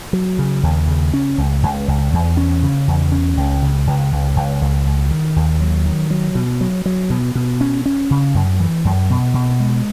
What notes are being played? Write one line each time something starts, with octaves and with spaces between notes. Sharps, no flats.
F#3
C#3
D#2
C#3
C#4
C#2
C#2
C#2
E2
C#4
C#3
E2
C#4
C#2
C#3
C#2
C#2
C#2
C#2
C#2
D#3
D#2
F#3
D#3
F#3
B2
F#3
F#3
B2
B2
C#4
C#4
C#3
F#2
E3
F#2
B2
B2
G#3